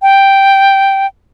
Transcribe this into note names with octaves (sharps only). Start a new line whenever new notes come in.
G5